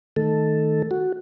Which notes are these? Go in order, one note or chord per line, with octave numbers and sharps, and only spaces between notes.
D#3 A3 A4
F#4